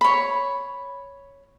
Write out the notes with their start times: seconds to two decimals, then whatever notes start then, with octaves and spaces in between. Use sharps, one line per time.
0.01 C#5 B5